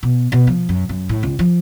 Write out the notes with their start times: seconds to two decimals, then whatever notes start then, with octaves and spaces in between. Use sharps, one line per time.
0.03 B2
0.32 B2
0.47 F3
0.69 F#2
0.89 F#2
1.09 A2
1.23 C#2
1.39 F3